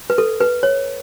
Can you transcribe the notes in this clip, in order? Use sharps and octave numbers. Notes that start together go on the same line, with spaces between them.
B4
A4
B4
C#5